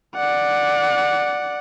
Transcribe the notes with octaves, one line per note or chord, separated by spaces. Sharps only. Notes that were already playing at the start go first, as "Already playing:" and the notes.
D5 F#5